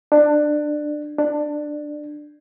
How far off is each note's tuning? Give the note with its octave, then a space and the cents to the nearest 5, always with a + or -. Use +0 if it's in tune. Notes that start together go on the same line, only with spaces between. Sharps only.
D4 +20
D4 +15